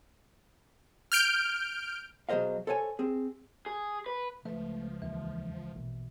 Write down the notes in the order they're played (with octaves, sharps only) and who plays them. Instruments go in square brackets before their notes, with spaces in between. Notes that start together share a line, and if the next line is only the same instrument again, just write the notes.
[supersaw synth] F6 G6 D7
[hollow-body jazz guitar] B2 F#3 G#4 C5 D#5 F5
A4 C5 C#5 F5 G#5
C4 G#4
[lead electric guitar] G#4
B4
[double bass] C#2 [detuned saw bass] F3 [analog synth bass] A3 [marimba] B4 E5
[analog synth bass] D#2 [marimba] E3
[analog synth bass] A#1 [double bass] B2